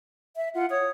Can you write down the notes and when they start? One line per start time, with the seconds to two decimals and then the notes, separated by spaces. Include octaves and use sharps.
0.36 E5
0.55 F4 F#5
0.70 C#5 D#6